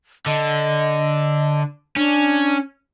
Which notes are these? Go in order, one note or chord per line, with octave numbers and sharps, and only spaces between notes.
D3 D#5
C#4 D4